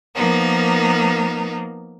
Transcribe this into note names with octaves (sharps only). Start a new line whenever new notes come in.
F3 A#3 B3 D#4 A#4